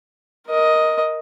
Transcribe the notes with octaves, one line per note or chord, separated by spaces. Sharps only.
A#4 D#5